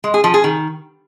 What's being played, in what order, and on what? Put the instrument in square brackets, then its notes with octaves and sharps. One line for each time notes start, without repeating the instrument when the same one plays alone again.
[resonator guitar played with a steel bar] G#3
G#4
F3
G#4
D#3